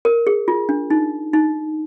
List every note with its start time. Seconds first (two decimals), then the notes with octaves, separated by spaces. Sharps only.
0.05 A#4
0.27 G#4
0.48 F4
0.69 D4
0.90 D#4
1.33 D#4